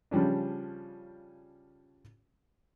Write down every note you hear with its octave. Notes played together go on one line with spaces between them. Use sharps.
C#3 F3 G3 C#4 D4